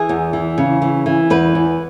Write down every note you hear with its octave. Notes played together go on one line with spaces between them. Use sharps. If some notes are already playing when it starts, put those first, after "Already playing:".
Already playing: E3 G#4
E2
E3
C#3
E3
E3
E2 B4
E2